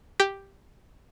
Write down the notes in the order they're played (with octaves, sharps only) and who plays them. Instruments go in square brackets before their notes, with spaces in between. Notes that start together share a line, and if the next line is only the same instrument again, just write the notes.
[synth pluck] G4